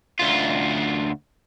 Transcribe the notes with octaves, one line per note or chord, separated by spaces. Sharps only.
D2 F4